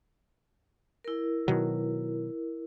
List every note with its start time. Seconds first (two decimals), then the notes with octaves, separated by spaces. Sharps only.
1.04 E4 A#4
1.48 B2 D#3 F#3